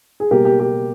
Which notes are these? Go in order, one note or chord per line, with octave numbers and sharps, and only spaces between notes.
G#4
B2 G3 A#3 G4 A#4
G4
G4